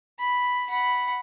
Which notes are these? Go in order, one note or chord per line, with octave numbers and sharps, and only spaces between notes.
B5
F#5 B5